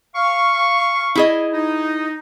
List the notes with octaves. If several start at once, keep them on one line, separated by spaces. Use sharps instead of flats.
F5 C#6
E4 G#4 D#5
D#4